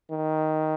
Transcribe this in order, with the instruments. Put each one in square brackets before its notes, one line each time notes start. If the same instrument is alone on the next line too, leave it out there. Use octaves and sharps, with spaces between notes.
[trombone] D#3